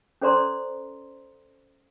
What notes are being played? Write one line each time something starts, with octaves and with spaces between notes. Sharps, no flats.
C#4 A4 C5 D5 A#5 C6